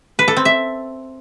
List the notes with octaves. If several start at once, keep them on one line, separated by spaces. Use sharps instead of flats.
B4
A4
C4
E5